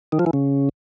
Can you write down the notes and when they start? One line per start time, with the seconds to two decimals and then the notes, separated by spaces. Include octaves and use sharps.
0.12 D#3
0.19 F3
0.26 E3
0.33 C#3